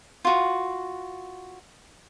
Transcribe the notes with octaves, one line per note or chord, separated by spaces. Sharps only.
F4 F#4